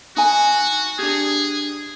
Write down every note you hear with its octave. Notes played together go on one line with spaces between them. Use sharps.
D#4 F#4 G#5
D4 G4 G#4